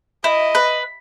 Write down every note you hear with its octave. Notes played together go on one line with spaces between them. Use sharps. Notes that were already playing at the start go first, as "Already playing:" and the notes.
E4 D#5
B4